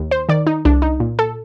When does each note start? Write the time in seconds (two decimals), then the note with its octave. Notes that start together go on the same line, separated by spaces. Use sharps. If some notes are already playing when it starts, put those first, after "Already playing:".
Already playing: D#2
0.11 C5
0.29 D#3 D5
0.47 D#4
0.65 C2 D4
0.82 D#4
1.00 A#2
1.19 A4